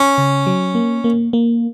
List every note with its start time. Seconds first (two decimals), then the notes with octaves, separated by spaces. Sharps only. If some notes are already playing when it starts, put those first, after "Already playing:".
Already playing: C#4
0.18 C#3
0.47 F#3
0.75 A#3
1.04 A#3
1.33 A#3